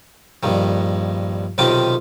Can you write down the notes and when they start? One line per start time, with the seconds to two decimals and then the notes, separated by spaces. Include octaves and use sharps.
0.43 A#1 G2 D#3
1.58 B1 C3 D#3 F4 G4 D6